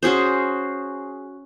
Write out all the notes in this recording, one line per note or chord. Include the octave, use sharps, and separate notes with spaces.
C#4 F#4 G#4 C5